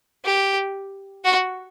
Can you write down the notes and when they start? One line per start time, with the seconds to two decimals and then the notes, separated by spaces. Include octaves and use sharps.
0.25 G4
1.24 F#4